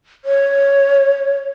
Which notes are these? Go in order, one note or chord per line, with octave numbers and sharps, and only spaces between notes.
C#5